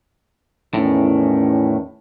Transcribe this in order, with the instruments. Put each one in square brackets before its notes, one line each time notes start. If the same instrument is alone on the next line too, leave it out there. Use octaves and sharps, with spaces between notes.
[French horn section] E2 D#3 C#4 [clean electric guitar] A2